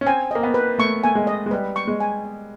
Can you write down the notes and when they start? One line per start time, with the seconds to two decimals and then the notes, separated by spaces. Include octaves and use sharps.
0.01 C#4
0.06 C4 G#5
0.31 A#3 D#5
0.43 B3
0.54 B4
0.78 A3 C#6
1.04 A3 G#5
1.15 G#3
1.27 D#5
1.46 G#3
1.51 G3 B4
1.76 C#6
1.87 G#3
2.00 G#5
2.25 D#5